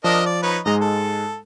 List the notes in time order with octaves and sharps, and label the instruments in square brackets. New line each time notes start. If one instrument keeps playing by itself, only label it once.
[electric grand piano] F3 [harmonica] D4 A#4 D#5
[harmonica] D5
D#4 B4 C#5
[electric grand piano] G#2 G#3 [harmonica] D#5 A#5
[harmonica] A4